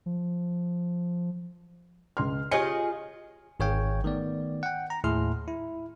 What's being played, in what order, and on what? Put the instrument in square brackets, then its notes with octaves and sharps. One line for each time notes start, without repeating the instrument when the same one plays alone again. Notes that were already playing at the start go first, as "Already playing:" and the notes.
[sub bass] F3
[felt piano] C#2 C6 F6
[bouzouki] F4 G#4 D#5 [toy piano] G4 C#5 G#5 [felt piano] C#7
[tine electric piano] G#1 G#4 C#5 F5 G5
D#3 A3 B3 D5
F#5 G5
A#5
D#2 A2 E4 G#4 C6 F6
E4